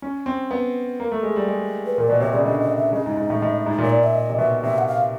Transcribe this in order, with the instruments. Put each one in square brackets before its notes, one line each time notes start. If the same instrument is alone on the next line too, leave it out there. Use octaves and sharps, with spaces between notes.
[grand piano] C#4
C4
B3
A#3
A3
G#3
G3
G#3
[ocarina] B4
[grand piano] A#2 [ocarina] A#4
[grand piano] B2 [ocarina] D5
[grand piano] C3 [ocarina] C#5
[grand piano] C#3 [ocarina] D5
[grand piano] D3 [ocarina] D#5
[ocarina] D#5
E5
[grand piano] C#3 [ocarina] D#5
[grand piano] G#2
G#2
A2
A2
G#2
A#2
[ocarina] C#5
D5
E5
D#5
[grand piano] C3
[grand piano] B2 [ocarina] E5
[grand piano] C3 [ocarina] E5
[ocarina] F#5
F5